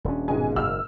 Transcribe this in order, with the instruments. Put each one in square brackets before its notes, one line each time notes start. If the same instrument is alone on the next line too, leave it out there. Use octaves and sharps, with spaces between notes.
[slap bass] D#1 C#4 [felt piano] D4
[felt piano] G#2 B2 G#3 [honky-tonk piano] G#5
[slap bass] F#1 F#2 [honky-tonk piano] E6 F6